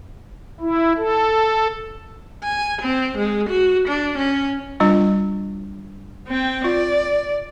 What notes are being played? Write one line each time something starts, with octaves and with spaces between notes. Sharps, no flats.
E4
A4
G#5
C4
G#3
F#4
D4
C#4
G3 D4 F4
C4 G5
F4 D5